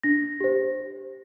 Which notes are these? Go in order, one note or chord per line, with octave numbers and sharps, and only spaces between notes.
D4 A#6
G4 C5